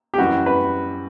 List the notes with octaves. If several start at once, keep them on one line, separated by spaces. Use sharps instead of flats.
G4
F#2 E3 G3 F#4
B4